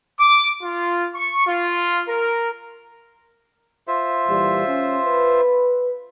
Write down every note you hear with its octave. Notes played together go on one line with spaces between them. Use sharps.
D6
F4
C#6
F4
A#4
F4 C5 E5
A#2 E3 G3
C#4
B4